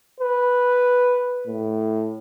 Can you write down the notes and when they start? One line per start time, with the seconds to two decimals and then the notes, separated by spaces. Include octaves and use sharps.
0.20 B4
1.47 A2